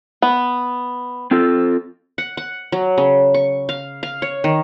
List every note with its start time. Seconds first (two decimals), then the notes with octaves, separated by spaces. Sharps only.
0.22 B3
1.31 C4 F4 A4
2.18 F#5
2.37 F#5
2.72 F#3
2.98 C#3
3.34 C#6
3.69 F5
4.03 F5
4.22 C#5
4.44 D#3